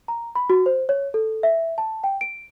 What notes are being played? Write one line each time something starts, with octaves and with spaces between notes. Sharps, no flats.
A#5
B5
F#4
C5
C#5
A4
E5
A5
G5
D7